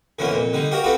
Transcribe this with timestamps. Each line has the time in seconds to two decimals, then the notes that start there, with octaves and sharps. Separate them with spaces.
0.19 E2 D3 E3 F3 A#3 C#4
0.32 F2 A#2
0.53 D3 G3 D#4
0.71 F#4 G4 A#4 F5
0.84 B3 C4 F4 F#4 A4 C5